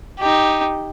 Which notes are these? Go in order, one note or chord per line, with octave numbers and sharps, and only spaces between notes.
D#4 G4